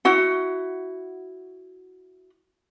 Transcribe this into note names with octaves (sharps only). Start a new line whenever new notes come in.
E4 F#4 F#5